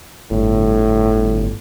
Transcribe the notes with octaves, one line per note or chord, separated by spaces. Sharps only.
G1 A2